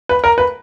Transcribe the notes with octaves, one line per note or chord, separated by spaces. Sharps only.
B4
A#4
B4